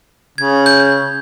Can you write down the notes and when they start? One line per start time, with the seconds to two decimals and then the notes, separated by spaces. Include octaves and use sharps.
0.38 C#3 G#6
0.66 G6